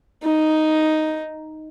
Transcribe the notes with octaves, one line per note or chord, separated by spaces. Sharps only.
D#4